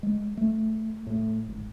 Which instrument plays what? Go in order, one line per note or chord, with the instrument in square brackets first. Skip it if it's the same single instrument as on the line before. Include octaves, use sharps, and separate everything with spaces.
[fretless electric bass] G#3
A3
A2
G#1